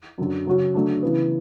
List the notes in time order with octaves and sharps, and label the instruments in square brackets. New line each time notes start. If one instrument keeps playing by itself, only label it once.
[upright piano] F#2 D3 F#3
C#3 F#3 C#4 F#4
D3 F#3 A3 D4
C#3 E3 B3